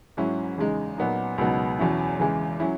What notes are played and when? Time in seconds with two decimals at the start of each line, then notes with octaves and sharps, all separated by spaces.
0.17 G#2 F#3 C#4 E4
0.58 E2 C#3 G#3 D#4
0.98 A#2 F#3 B3 D#4
1.38 C#2 B2 F#3 B3 D#4
1.79 E2 B2 F#3 C#4 E4
2.19 E2 C#3 E3 G#3
2.60 F#3 C#4 E4